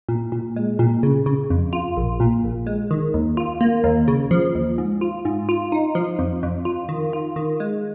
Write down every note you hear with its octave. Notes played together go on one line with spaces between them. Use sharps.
A#2
A#2
G#3
A#2
C#3
C#3
F2
F4
A#1
A#2
A#1
G#3
D#3
D#2
F4
A#3
D#2
C#3
F3
D#2
G#2
F4
G#2
F4
D#4
F3
F2
F2
F4
D#3
F4
D#3
G#3